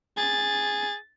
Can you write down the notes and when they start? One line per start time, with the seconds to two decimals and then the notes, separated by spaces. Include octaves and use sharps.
0.18 G#4 A6